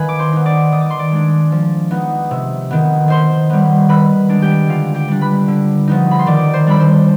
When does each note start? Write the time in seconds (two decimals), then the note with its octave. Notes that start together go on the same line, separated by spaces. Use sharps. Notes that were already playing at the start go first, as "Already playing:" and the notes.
Already playing: D#3 B4 F5 G#5 B5
0.09 D6
0.19 C5 C6
0.33 B3 D#4
0.46 D5 D6
0.72 D#3 D#6
0.81 D6
0.90 C6
0.99 D5 D6
1.11 G#3 D4
1.52 F3
1.91 B3 D#4
2.31 C3
2.71 D#3 B3
3.08 D#3 C5 C6
3.50 G3 B3
3.89 D#3 B4 B5
4.29 G#3 D4
4.42 G4 G5
4.67 D3 F4 F5
4.95 G4 G5
5.08 G3 D4
5.21 B4 B5
5.48 D3
5.88 F3 B3 D#4
6.11 B5
6.19 C6
6.27 D#3 D5 D6
6.54 C5 C6
6.67 G3 D4 B5
6.80 C5 C6